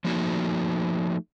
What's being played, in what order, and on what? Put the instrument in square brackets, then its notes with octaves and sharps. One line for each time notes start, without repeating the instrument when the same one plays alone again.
[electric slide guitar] F3 A3 A#3 D#4 F#4